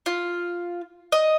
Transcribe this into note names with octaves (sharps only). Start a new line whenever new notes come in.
F4
D#5